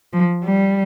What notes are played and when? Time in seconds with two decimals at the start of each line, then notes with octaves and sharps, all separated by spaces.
0.13 F3
0.44 G3